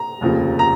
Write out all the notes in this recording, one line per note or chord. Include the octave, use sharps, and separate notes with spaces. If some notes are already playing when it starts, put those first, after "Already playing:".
Already playing: A#5
F1 D#2 C#3 F3
A#5